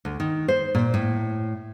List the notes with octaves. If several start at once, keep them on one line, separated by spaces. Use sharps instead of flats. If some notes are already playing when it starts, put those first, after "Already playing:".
D2
D#3
C5
A#2
A2